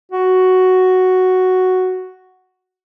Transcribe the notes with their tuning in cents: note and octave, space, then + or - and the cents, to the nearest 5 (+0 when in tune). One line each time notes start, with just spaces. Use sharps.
F#4 +5